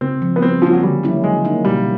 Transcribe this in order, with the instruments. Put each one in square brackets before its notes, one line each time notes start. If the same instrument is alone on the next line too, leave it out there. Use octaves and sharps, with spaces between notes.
[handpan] C#3 [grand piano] C4
[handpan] F3 G#3
[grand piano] B3
[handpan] G3 [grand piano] C4
[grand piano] F3 [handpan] A#3 C#4
[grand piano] F#3
[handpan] D3 [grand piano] G3
[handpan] F#3 A#3 C#4 E4
[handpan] F#3 [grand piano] G#3
[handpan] A#3 D#4
[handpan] B2 [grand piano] G3